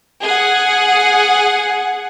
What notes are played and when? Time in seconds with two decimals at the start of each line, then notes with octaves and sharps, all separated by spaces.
0.22 G#4 F#5